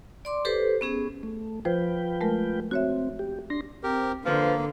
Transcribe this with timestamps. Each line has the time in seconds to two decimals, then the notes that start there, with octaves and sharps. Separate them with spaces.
0.25 D5 C6 D6
0.45 G4 A4 B4 C5
0.81 B3 C#4 G#4
1.23 A3
1.65 F3 F4 B4 C5 G5
2.21 G#3 A3 A#4
2.71 C4 F#4 C#5 E5
3.19 G4
3.50 D4 C6 A#6
3.83 C4 G4 A#4
4.24 D3 F3 A#3 B4